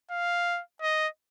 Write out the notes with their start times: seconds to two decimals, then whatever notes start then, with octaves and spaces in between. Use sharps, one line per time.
0.11 F5
0.82 D#5